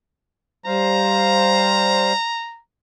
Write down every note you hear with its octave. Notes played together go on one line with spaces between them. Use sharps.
G3 C5 F5 A#5